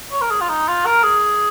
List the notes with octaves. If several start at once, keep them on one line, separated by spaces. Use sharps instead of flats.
C#5
A#4
G#4
F4
D#4
F4
A#4
G#4